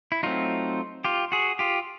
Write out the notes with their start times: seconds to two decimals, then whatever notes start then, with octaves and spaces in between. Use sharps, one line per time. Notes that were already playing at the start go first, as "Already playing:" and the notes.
0.12 E4
0.23 F#3 A3 C4 D#4 F4
1.04 F4 G4
1.32 F#4 G#4
1.59 F4 G4